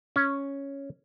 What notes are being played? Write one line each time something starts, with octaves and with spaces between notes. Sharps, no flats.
C#4